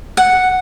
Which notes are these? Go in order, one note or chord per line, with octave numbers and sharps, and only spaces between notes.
F#5